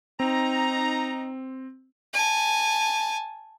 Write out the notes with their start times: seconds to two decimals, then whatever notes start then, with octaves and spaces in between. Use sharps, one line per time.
0.20 C4 D#4 A#5
2.14 G#5 A5